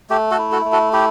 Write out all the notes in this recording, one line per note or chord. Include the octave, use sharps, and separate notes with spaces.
A3 G4
F#4 A4
E4
F#4 A4
A3
F#4 A4
E4 G4